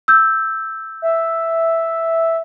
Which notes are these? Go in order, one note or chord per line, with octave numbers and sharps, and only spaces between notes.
E6 G6
E5